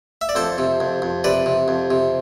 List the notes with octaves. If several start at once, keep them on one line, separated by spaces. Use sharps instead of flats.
E5
D5
F2 A4 C5
C3
F2
F2
C3 B4 D5
C3
F2
C3